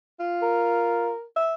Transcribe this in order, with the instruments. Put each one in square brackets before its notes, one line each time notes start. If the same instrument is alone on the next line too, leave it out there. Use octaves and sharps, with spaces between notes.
[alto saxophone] F4
[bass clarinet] A#4
[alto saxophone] E5